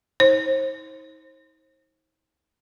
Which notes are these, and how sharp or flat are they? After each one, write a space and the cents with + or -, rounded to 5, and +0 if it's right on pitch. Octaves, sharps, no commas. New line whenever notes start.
D#4 +40 C5 +35